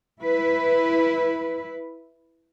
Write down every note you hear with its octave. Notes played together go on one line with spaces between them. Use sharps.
E4 B4